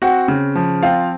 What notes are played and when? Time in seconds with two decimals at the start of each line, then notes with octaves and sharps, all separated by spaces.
0.02 C4 F#4 F#5
0.28 C#3
0.55 F3
0.83 C4 F4 F5